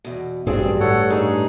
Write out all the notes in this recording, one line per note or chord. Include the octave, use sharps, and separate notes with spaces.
E2 B2
A1 G2 D#3 F#3 C4 D4 G#4
A2 A4 C#5 F#5
A#2 D4 D#4 G#4